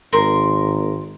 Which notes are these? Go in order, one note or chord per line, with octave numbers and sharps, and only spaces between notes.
G#1 A#4 C6